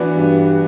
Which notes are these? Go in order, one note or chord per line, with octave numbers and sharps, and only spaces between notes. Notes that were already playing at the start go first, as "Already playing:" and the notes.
Already playing: E3 B3 D4 F#4
G2